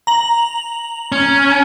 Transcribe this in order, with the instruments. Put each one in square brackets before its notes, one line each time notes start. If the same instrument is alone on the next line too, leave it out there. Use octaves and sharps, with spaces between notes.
[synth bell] A#5 F#7
[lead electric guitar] C#4